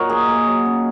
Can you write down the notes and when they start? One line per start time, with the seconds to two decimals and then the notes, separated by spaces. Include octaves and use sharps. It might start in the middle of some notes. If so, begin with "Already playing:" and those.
Already playing: A#2 F#3 A#4 C#5 D#5 F#5
0.09 A#3 G#4
0.28 A#3
0.47 F#3
0.66 C#3